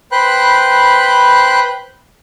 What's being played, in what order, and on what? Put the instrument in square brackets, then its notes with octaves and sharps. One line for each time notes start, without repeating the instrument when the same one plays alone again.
[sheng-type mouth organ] B4 C5 G5 B5 F#6